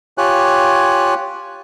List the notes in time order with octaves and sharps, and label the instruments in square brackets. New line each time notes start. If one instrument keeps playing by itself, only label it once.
[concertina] F4 G4 C#5 G#5 F#6